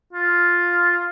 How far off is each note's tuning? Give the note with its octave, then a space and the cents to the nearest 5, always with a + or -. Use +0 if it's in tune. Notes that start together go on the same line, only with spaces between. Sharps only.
F4 +5